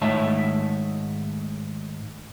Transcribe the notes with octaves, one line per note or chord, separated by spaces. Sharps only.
G#2 D#3 A3 C#5 E5 A5